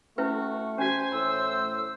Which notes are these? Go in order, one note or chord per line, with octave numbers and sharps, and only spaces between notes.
A3 C#4 E4 F#4 B4
C#4 F#4 C5 G#5
A2 C6 E6